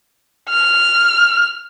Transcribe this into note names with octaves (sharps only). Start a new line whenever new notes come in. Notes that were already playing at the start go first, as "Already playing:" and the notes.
F6